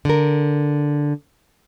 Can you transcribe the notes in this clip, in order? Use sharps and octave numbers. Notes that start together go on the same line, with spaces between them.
D3 A#4